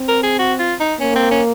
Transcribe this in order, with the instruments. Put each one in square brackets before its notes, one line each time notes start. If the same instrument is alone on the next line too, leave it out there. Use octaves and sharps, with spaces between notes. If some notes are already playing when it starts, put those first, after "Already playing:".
Already playing: [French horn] C4
[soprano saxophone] A#4
G#4
F#4
F4
D#4
[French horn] A#3 [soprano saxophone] C#4
[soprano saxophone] C4
C#4